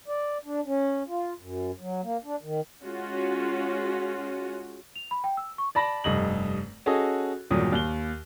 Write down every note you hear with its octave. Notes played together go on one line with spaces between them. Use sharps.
D5
D4
C#4
F4
F#2
F#3
A#3
D4
D#3
G#3 C#4 F4 F#4
F7
B5
G5
E6
C#6
D5 A5 B5 A#6
F1 G2 D#5 F#7
C#4 F#4 G#4 A4 D#5
E2 G2 A#2 D#3 F#3 D#6
D#2 G7